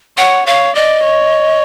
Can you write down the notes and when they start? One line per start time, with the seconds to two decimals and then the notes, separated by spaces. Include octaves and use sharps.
0.18 C#5 F#5
0.47 C#5 F5
0.75 D5 D#5
1.04 C#5